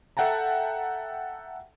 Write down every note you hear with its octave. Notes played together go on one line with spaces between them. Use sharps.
A4 E5 F#5 G5 A5 A#5